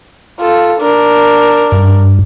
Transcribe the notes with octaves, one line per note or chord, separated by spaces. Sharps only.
F4 A4
D4 A#4
G2